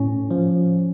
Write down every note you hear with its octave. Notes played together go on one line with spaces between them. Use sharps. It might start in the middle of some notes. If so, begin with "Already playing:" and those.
Already playing: A2 C#4
F3